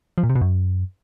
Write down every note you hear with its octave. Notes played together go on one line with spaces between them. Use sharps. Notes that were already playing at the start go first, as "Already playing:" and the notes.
F3
A#2
C3
B2
F#2